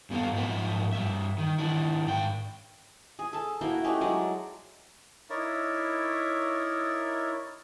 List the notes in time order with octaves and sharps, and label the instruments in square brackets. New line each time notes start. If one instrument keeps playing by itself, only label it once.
[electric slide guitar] G2 B3 A4 F5
G#2 F3 D#4 A#4 E5
G2 G3 E5
D#3
D#3 D4 E4
G#2 G5
[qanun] G#4
A4 A5
A#3 E4 F#4 G5
A3 C#4 D#4 G4
F#3 G#3 D5
[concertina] D#4 E4 A#4 C#5 D5 E5